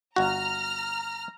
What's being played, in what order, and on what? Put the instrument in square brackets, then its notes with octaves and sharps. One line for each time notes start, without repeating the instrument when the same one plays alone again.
[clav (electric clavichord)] G1 F#4 [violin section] A#5 F6